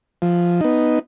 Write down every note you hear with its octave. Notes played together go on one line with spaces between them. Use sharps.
F3
B3 D#4